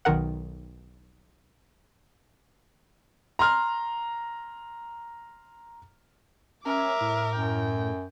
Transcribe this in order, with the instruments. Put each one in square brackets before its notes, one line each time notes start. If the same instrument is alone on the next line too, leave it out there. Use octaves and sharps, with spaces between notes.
[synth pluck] B1 D#3 A#4 F#5
[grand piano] A#5 C6 F6
[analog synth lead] C#4 [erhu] A#4 [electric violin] E5 D6
[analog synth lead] A2
[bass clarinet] F#2 [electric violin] G5